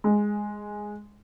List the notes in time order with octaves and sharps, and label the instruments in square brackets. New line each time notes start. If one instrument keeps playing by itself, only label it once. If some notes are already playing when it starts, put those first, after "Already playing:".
[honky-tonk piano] G#3